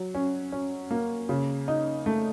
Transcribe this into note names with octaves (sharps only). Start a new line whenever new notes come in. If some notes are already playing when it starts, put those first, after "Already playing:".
Already playing: F#3
C#4
C#4
A#3
C#3
D#4
A3